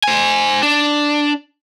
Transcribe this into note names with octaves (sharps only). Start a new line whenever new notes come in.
C5 G#5
D4